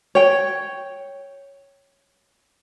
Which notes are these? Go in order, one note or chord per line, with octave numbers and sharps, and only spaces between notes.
C#5 G5